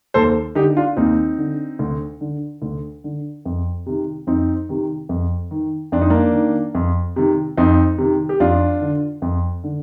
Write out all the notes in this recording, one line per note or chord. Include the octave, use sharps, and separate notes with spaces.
D#2 A4 C5
D3 D#4 G4
D4 F4
D#2 C4 D#4
D3
D2
D3
D2
D3
F2
C3 D#3
F2 C4 D#4
C3 D#3
F2
D#3
F2 D4
D#4
A#3 D4
D#3
F2
C3 D#3
F2 C4 D#4
C3 D#3
G4
F2 D4 F4
D3
F2
D3